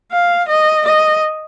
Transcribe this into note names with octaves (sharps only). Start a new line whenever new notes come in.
F5
D#5
D#5